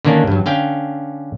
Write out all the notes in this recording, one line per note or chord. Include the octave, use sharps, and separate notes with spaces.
D3 D#3 A#3 C#4 D4
G2 F#3
D3 C#4 F5 G5